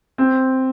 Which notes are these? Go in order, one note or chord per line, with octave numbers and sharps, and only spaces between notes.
C4